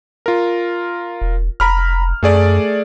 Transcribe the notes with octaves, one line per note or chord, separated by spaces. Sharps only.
F4 A#4
E1
F1 A#5 B5 F6
F#2 A3 G#4 D5